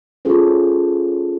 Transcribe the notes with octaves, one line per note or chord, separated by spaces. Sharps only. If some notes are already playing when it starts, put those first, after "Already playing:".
C#4 F4 G#4 A4 C5